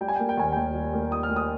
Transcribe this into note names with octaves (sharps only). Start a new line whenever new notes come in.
G3 G5
G#5
A#3 G5
G5
D#2 G#5
D#2 G5
G3
A#3
D#3 D#6
F6
A#3
D#6